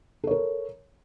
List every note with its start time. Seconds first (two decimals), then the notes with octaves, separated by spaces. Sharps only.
0.24 A4
0.27 C#5
0.31 A#4